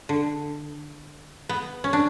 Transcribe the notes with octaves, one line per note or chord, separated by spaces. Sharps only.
D3
B3
C#4
D4